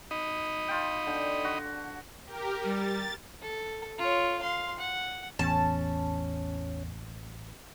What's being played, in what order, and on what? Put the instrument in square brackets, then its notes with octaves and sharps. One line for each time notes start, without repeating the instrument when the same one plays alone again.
[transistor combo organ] D#4 D#5 B5
[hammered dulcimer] F4 G5
D3
F#4
[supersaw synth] G4 A#4
[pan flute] G3 [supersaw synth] A6
[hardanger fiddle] A4
F4 C#5
F5 C6
F#5
[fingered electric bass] A1 [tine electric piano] E2 [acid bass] C#4 [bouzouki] A5